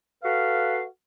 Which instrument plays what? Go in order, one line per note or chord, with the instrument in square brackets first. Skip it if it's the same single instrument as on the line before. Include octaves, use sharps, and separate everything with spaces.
[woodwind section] F#4 A4 B4 F5